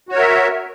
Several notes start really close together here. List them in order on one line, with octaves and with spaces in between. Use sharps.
F#4 C#5 A#4 E5